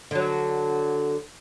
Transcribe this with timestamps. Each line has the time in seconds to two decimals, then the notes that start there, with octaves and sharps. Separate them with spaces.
0.11 D3 F#3